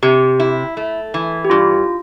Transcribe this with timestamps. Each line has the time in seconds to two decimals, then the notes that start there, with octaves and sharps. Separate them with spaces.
0.03 C3 G4
0.40 E4
0.77 A3
1.14 E3
1.44 G4
1.50 G2 F4